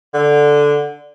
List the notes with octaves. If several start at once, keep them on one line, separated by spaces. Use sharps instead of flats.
D3